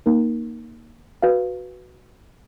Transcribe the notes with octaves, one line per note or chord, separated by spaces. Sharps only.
A#3 D#4 A#4
F#4 B4 F5